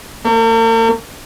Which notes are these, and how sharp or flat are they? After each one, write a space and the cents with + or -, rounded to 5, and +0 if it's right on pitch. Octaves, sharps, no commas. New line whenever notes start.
A#3 -45